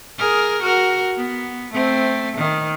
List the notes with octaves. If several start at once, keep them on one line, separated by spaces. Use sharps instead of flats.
G#4 A#4
F#4 A#4
B3
A3 C4
D#3